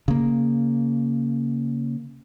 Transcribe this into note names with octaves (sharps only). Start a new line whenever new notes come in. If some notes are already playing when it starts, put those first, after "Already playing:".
C#3 A#3